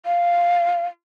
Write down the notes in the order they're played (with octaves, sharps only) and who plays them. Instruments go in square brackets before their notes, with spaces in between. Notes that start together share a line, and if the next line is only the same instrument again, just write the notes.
[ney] F5